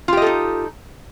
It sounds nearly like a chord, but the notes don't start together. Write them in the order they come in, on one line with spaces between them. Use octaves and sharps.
F4 G4 D#5 A4 D#4